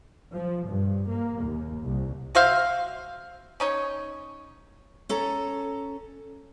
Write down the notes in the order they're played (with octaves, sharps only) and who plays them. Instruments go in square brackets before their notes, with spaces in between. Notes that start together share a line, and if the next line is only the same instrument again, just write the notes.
[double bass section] F3
G2
A#3
D#2
C2
[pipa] F#4 C5 E5 F5
C#4 D#4 C#5
[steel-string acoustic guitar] C#4 A4 A#5